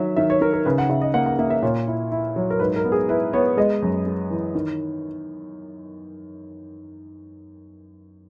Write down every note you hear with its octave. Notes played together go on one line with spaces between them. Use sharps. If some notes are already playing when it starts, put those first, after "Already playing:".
Already playing: D#3 F#3 E5
D#3 E5
C#5
D#3 A#4
A#4
C#3 B4
F#5
C#3 E5
D#5
A#3 F#5
F#5
A#3 E5
E5
A#2 C#5
E4
E4
F#3
A#4
G#2 B4
A#4
B3
G#4
E4 B4
B3 C#5
G#3 D#5
F#2
G#3
E3
D#3